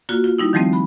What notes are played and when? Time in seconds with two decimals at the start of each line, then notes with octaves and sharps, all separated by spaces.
0.09 A#3 F4 F#4
0.24 F4
0.38 G3 D#4 E4
0.53 D#3 F3 G3 A3 C4
0.73 B5